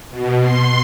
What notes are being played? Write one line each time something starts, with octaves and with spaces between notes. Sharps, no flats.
B2
C6